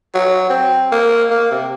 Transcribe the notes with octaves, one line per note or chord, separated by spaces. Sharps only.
F#3
C4
A#3
A#3
C3